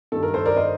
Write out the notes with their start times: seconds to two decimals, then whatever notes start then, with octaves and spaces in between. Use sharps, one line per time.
0.12 G2 D#3 A4
0.23 A#4
0.34 A4 C5
0.45 A#4 D5
0.56 C5 D#5